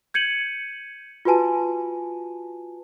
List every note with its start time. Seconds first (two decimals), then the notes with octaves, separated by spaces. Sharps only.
0.14 G6 G#6 C#7 D#7 F#7
1.25 F4 F#4 B4 G#5 A5